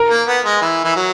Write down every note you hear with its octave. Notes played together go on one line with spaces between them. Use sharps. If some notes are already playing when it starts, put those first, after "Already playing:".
Already playing: A#4
A#3
B3
G#3
E3
E3
F#3